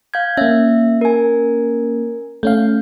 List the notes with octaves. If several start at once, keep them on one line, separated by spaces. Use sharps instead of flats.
F5 G6 G#6
A#3 C#4 E5
A#4 G#5
A3 C#4 F5 G6